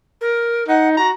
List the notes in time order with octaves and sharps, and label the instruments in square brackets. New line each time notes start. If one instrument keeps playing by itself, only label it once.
[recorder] A#4
[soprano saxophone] D#4 [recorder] F#5
[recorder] F#4 [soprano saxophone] A#5